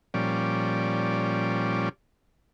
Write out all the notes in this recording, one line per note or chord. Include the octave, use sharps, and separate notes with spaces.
A#2 F3 G3 C#4 D5